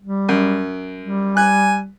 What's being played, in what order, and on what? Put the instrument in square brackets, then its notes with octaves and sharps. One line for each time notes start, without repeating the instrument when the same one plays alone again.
[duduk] G3
[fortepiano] F#2
[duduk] G3
[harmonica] G#5 [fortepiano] F#6